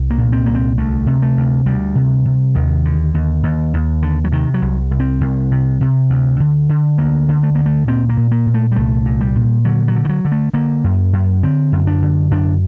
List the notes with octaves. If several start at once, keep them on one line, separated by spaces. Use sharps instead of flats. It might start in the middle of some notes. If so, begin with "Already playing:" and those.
Already playing: C2
A#3
A#2
C4
C2 A#3
C4
D2 A3
C3
A3
D2
D2 G3
C3
C3
D#2 D#3
D3
D#2
D#2
D#2
D3
F#3
C3 D#3
F#3
C2
C2
C4
C2
C3
C3
D2
D3
D3
D2 A#3
D3
A3
D2 A#3
A3
A#2 C4
A#3
A#2
A#3
A#2
A3
G3
C2 A3
A#2
G3
A#2
D3 F#3
F#3
D3
D#3
F#3
D3
A3
D3 A#3
F#2
F#2
D3 C4
F#2
D4
D3
F#2 D4